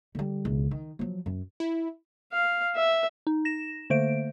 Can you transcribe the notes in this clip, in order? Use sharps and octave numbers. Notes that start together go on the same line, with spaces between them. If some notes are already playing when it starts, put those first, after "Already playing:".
D3 G3
E1 C#2
D#3
F3 F#3
F#2
E4
F5
E5
D#4
A#6 E7
D3 A3 A#3 C5 D7